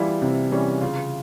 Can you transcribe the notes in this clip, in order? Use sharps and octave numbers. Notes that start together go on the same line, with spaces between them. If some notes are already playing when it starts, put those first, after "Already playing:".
Already playing: E3 G3 E4 F4
C3 C4
E3 G3 C#4
C#3 F4